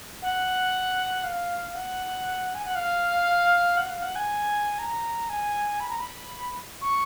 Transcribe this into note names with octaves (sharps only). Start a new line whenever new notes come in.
F#5
F5
F#5
G#5
F#5
F5
F#5
F5
F#5
G#5
A#5
G#5
B5
A#5
B5
C#6